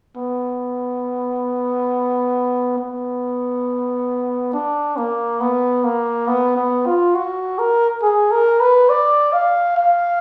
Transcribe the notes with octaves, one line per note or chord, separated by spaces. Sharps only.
B3
B3
D4
A#3
B3
A#3
B3
B3
F4
F#4
A#4
G#4
A#4
B4
D5
F5
F5